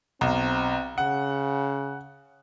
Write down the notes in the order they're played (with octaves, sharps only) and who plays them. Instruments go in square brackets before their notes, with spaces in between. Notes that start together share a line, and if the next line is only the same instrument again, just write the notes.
[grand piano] B1 [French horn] C4
[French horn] C#3 [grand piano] F#5